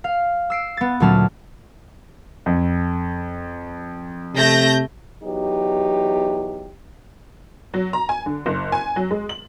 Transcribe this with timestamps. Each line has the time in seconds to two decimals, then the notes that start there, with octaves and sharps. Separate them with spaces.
0.04 F5
0.50 E6 C7 D7
0.77 B3 A6
1.00 D2 A#2 F#3 C#4 A5 F6
2.46 F2
4.35 C3 A3 G6 A#6
5.23 E2 F#3 B3 D#4 G4
7.74 F#3
7.93 A#5
8.09 G#5
8.26 D3
8.46 F#1
8.72 G#5
8.96 F#3
9.11 G#3
9.29 F#7